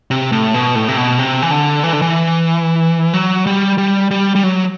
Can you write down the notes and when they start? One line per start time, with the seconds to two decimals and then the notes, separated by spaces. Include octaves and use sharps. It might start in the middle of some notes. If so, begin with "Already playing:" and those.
0.11 C3
0.32 A2
0.54 B2
0.75 A2
0.88 C3
0.97 B2
1.19 C3
1.42 E3
1.51 D3
1.84 E3
1.93 D3
2.02 E3
3.14 F#3
3.46 G3
3.78 G3
4.11 G3
4.36 G3
4.43 F#3